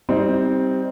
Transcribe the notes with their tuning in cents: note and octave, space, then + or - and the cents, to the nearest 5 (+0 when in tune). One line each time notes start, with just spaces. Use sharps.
G3 +0 C4 +0 D#4 +25